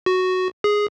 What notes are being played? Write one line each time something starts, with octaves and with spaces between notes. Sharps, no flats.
F#4
G#4